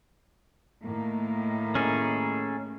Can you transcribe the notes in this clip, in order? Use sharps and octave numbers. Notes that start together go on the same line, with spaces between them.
A2 D#3 A#3
C#4 G#4 A4